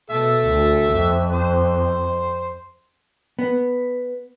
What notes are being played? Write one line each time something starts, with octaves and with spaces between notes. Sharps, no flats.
B2 A4 E5
D2
F2
C5
B3